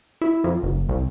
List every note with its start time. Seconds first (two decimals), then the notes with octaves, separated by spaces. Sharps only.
0.22 E4
0.44 F2
0.63 F#1
0.89 C2